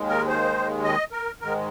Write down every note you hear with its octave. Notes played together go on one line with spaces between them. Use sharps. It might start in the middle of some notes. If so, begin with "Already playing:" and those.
Already playing: D#2 D#3 G#3
A#4
C5
D#5
A#4
G#2 D#3 G#3 A#4